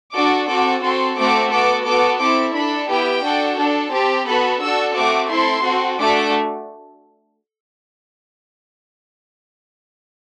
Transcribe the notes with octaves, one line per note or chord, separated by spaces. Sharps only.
D4 F#4 A4 D6
C4 F#4 A4 D6
C4 F#4 A4 C6
A3 C4 F#4 A4 D6
B3 F#4 A4 D6
B3 F#4 A4 D6
C4 E4 A4 D6
D4 A4 B5
B3 E4 G4 G5
D4 F#4 A4
D4 A4
C4 G4 A5
B3 F#4 A4 B5
D4 F#4 A4 E6
A3 C4 F#4 D6
C4 E4 A4 C6
C4 F#4 A4
A3 D4 F#4 A4 D6